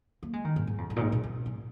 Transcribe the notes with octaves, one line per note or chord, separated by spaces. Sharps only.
A#3
G#3
D#3
G#2
G#2
F2
G#2
A#2
G#2
A#2
C#3
G#2